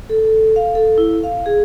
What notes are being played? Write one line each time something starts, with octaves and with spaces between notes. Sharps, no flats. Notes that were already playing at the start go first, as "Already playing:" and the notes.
A4
A4
F5
A4
E4
F5
G#4